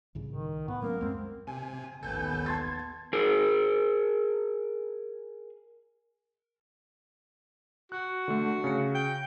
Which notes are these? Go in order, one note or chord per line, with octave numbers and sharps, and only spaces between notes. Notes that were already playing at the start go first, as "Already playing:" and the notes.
C2 A2 C#3
D#3
A2 B3
F#3 G3 A#3 C#4 A#4
C#2 F#2 G#3 C4
C3 G#5
A1 D#2 B3 A4 G#5 G6
A5 C6 G#6 A6
G#4 A#4
F#4 F#6
D3 A3
C#3 C#7
G5